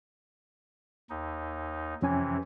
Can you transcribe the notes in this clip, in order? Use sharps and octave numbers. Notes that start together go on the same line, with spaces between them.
D#2 D#4
F2 C3 E3 C#4 G#5